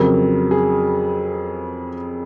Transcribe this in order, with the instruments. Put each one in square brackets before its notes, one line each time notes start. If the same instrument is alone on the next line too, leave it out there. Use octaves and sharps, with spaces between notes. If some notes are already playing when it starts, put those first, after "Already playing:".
Already playing: [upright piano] F2 C#3 F#3 A#4
G#4